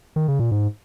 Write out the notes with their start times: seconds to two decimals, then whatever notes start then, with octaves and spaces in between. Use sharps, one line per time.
0.16 D#3
0.28 C#3
0.39 A#2
0.51 G#2